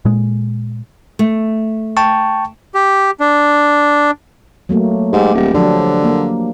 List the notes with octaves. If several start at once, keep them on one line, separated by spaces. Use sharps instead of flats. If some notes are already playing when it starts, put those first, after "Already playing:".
A#2 G#3
A3
G5 A5 C#6
G4
D4
F#3 A3 A#3
G#2 G4
D#1
D3 F3 F#3 D4
A#3